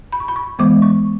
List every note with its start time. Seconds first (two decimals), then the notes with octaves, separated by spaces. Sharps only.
0.12 B5
0.20 C#6
0.28 B5
0.36 C#6
0.59 E3 G#3 B3 D6
0.82 C#6